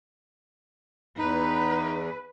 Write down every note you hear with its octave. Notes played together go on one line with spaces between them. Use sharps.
E2 D#4 B4